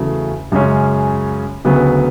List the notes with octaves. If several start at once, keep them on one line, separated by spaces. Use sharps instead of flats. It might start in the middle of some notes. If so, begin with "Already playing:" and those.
Already playing: E2 C#3 F#3 A3 E4
F#2 C#3 G#3 C#4
D2 C#3 F#3 B3